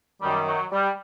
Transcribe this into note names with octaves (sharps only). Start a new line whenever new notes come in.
F#2 D#3 G3
F#3
G3